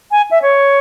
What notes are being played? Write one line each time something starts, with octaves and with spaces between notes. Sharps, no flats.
G#5
E5
C#5